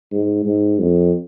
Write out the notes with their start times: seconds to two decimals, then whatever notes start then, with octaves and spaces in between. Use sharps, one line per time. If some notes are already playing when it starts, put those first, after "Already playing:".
0.12 G#2
0.46 G#2
0.80 F2